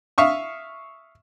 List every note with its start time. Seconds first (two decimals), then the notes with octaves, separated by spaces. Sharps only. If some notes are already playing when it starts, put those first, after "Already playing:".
0.18 E5 F5 C#6 D#6